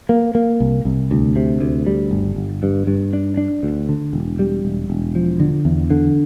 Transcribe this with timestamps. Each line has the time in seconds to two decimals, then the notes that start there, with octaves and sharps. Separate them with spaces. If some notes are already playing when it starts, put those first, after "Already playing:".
0.09 A#3
0.35 A#3
0.60 C2
0.85 C2
1.11 D2
1.36 C3
1.61 D2
1.87 G3
2.11 G1
2.36 G1
2.63 G2
2.87 G2
3.13 D4
3.37 D4
3.63 D2
3.89 D3
4.13 E1
4.39 G3
4.65 E1
4.90 E1
5.15 F3
5.40 D3
5.65 E2
5.90 D3